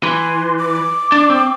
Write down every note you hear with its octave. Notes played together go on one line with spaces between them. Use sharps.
E3 C6
D6
D4
C4